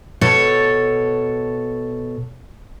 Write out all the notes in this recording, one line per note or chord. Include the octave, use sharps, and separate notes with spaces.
B2 A4 C#5